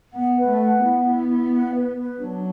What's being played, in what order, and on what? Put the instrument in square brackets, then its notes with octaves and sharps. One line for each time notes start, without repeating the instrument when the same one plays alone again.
[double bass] B3 [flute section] F#5
[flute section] B4
[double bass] A3
[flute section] F#5
[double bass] B3 [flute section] E4
[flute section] E4
E4
F#5
B4
B4
[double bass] F#3 [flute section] D4